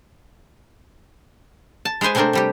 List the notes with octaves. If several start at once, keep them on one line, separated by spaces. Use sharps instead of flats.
A5
G#3 G#4 B4 C5 G#5
C3 A3 C4 D4 A#4 C5
C3 G3 G4